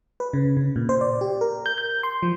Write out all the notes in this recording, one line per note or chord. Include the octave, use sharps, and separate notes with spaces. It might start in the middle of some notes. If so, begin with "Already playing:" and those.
B4
C#3
C#3
A#2
C5
D5
G4
A#4
G6
G6
C6
F3